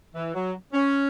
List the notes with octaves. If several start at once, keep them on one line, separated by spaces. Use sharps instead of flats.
E3
F#3
C#4